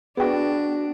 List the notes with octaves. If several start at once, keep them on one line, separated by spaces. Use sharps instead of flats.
B3 D4 F#4 G#4 G5